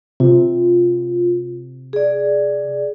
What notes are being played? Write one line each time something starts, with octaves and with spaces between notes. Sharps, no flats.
C3 F4
G#4 D5